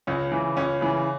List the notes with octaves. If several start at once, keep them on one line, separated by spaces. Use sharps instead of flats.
C#2 C#4
C#3 E3
C#2 C#4
C#3 E3